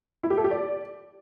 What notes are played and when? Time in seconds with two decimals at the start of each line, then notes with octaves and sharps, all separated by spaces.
0.23 E4
0.30 G4
0.37 A4
0.44 G4
0.51 D5